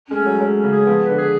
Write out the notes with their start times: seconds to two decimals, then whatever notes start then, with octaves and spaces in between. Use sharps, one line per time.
0.10 G#3 C#4
0.18 A3
0.25 F#3
0.40 F#3 G#3
0.56 C#4
0.64 C#3
0.71 G#4
0.87 F3 B3
1.02 B4
1.09 D3
1.18 G#4